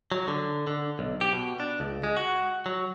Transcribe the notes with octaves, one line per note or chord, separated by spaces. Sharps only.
F#3
D3
D3
B1
G4
B2
D4
C#2
G#3
F#4
F#3